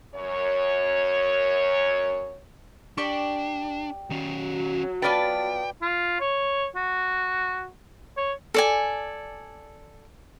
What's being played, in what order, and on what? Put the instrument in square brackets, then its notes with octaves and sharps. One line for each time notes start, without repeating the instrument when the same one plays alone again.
[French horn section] F#2 C#5
[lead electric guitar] D4 [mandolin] G4 D5 C#6
[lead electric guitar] D#3 C#4 [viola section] F#3
[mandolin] B3 F4 A5 [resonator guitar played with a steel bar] B4 D5 [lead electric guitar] G5
[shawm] F4
C#5
F#4
C#5
[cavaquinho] A4 D5 G#5